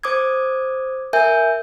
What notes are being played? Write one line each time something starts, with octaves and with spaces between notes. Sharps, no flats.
C5 D6 D#6 G#6
A#4 E5 G#5 G6